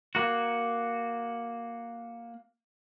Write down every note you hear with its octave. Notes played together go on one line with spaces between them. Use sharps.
A#3 F#4